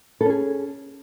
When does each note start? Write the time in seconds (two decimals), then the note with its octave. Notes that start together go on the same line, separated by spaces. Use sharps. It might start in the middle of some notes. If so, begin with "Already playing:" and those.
0.21 A4
0.25 C#4
0.30 G#4